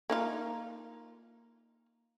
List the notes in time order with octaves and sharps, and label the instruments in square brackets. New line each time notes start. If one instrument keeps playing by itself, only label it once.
[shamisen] A#3 D#4 F4